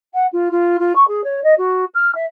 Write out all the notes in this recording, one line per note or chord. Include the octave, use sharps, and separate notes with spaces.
F#5
F4
F4
F4
C#6
G#4
C#5
D#5
F#4
F6
E5